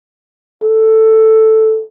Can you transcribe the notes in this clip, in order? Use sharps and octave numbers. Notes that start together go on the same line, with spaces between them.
A4